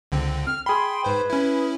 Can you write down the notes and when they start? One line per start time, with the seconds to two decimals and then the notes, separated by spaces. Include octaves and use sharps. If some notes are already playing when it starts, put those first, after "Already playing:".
0.12 C#2 D3 C4
0.46 F6
0.66 G#4 G5 B5 C6
1.04 G#2 B4 C5
1.30 C#4 E4